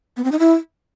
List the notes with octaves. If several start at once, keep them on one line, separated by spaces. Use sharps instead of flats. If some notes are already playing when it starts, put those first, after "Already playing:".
B3
C4
D#4
E4